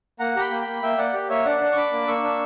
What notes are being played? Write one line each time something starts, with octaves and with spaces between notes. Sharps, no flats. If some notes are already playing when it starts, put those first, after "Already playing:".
A#3 F#5 A#5
G4 G5 A#5 B5
A#3
G5 B5
A#3
A#3 E5 G5
A#3 D5 F#5
G4
A#3 C#5 E5
D4 D5 F#5
D4
C#6
D4 B5 D6
A#3
A#3 C#6 E6
D4